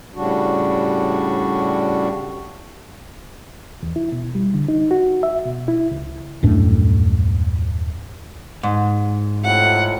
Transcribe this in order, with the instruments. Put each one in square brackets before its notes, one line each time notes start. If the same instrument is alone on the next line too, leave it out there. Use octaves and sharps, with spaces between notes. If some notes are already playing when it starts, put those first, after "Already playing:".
[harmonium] A2 C#3 G3 D4 F#4
[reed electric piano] E2
E4
B2
G3
D3
D#4
F#4
E5
B2
E4
C#2
[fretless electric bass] D#1 F#2 A2 D4
[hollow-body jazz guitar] G#2
[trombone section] F2 A2 C3 [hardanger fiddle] F#5